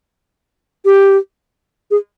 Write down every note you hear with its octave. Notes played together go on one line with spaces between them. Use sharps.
G4
G#4